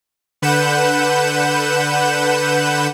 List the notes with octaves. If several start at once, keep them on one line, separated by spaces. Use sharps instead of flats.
D3 B4 F#5 G6 E7